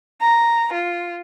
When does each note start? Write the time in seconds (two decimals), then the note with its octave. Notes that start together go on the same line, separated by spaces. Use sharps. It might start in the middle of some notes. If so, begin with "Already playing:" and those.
0.23 A#5
0.72 F4